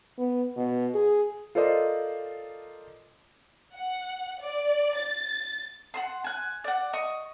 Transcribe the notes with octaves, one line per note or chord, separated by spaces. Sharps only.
B3
B2
G#4
F4 A4 A#4 C5 D5 D#5
F#5
D5
A6
F#5 A5 C6
G#5 F#6
D5 F#5
D#5 C#6